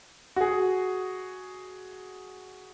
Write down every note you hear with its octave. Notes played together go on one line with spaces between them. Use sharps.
F#4 G#4